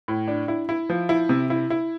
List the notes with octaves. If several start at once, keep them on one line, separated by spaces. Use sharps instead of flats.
A2
D4
E4
E4
F3
E4
C3
E4
E4